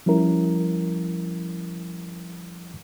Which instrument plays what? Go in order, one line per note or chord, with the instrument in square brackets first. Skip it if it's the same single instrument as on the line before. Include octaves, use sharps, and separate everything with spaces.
[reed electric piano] F3 G3 C#4 E4 A#4